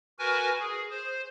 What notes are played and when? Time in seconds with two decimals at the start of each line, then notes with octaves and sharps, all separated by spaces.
0.19 F#4 A#4 B4 G#5
0.60 G#4
0.91 C5